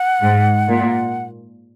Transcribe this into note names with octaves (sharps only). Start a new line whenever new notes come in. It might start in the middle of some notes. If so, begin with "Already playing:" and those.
Already playing: F#5
G#2
A#2